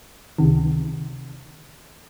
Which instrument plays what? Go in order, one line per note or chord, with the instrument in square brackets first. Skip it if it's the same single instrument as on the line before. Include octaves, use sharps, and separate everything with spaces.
[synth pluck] C#2 C3 D#3